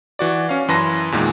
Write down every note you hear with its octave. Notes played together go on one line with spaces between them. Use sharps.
E3 F#4 D5
C#4 F5
F#2 E3 B4 A5 C6 A#6
E2 A#2 D#3 G#3